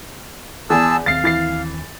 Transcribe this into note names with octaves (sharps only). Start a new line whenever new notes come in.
E2 G#4 A5 E6
D#2 A#3 C4 F5 A6 C7
E3 A6 C7